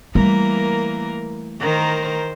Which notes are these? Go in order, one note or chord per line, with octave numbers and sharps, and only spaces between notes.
E3 G3 A3 A#3 A#4
D#3 A#4 C5